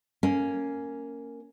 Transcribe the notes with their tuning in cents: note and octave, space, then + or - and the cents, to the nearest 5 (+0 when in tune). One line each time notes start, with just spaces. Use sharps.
A#3 -10 C#4 +0